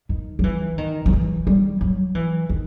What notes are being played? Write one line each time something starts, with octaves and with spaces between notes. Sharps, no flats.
D#3
F#3
E3
D#3
F#3
E3
G3
F#3
E3
D#3